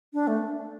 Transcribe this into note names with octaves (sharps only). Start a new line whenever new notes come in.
D4
A3